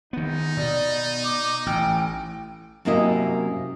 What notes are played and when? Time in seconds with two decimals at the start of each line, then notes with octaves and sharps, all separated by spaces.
0.13 D#3 B3 D#4
0.57 B2 D5
1.24 D6
1.66 A1 G5
2.85 F#2 C3 A#3 E4 D#5